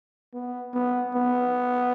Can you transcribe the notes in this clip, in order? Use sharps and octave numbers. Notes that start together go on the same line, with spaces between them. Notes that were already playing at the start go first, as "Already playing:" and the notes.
B3
B3
B3